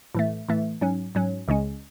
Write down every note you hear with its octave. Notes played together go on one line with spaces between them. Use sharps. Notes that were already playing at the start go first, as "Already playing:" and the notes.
A2 E3 A3
A2 E3 A3
G#2 F#3 C#4
G#2 F#3 C#4
C#2 C#3 G#3 C#4